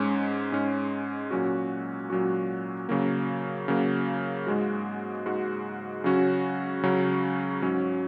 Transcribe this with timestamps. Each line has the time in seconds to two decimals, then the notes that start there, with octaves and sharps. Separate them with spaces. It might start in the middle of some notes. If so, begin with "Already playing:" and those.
Already playing: G#2 G#3 C#4
0.52 G#2 G#3 C#4
1.31 A#2 F#3 C#4 F#4
2.10 A#2 F#3 C#4 F#4
2.89 C#3 F#3 A#3
3.68 C#3 F#3 A#3
4.47 G#2 G#3 F#4
5.26 G#2 G#3 F#4
6.04 C#3 F#3 C#4 F#4
6.83 C#3 F#3 C#4 F#4
7.62 G#2 F#3 C#4